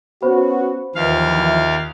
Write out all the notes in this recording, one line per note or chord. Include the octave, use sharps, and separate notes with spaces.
B3 C#4 F#4 C5 F5 B5
D#2 E3 F3 F5
F4 E5